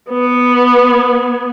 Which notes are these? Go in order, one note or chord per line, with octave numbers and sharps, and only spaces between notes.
B3